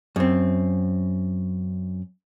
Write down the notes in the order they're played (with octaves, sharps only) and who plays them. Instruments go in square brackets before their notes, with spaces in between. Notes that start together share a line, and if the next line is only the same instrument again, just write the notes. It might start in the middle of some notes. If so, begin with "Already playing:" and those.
[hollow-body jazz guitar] F#2 C4